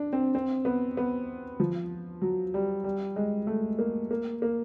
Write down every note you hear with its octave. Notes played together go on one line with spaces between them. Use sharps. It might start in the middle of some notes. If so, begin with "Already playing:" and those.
Already playing: D4
C4
C4
B3
B3
F3
F#3
G3
G3
G#3
A3
A#3
A#3
A#3